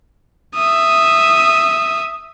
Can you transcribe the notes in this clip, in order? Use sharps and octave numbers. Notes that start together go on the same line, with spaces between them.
E5 D#6